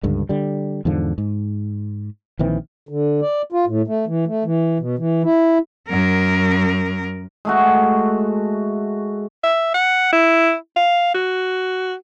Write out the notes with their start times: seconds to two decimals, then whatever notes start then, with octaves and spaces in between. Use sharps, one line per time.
0.03 C#2 G2 D3
0.29 D3 G3
0.85 E2 G#2 D3 F3
1.18 G#2
2.39 A#1 D#3 E3 C4
2.89 D3
3.22 D5
3.52 F4
3.67 A2
3.87 A3
4.07 E3
4.27 A3
4.45 E3
4.80 B2
4.99 E3
5.23 E4
5.89 F#2 A#4
7.45 G#3 A3 F#4
9.43 E5
9.74 F#5
10.13 E4
10.76 F5
11.15 F#4